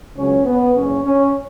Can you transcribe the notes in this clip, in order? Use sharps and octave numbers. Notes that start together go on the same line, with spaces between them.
C#2 C#3 F#3 C#4 C#5
B3
F#1 E2 C#3 C#4
C#4